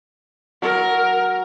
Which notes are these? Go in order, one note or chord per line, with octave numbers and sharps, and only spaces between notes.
F#3 A#4